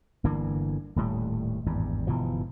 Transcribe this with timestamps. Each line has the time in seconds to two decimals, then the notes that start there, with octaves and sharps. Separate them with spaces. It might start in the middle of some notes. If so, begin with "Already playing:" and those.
0.24 G1 D3 E3 A#3
0.96 D#1 A2 G3
1.66 G#1 E2 G2
2.07 G1 B2 E3 F3